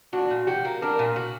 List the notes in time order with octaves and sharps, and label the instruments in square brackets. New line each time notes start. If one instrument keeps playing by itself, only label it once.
[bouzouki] D4 [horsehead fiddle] F#4
[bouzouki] A#2
[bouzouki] F#4 [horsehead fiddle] G4
[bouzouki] A#3
[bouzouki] D4 [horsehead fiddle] A#4
[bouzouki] A#2
F#4